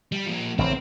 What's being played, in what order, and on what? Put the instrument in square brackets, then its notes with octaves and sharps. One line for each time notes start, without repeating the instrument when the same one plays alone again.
[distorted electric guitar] G3
F3 A#3
[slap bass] A1 C#3 [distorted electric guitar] C4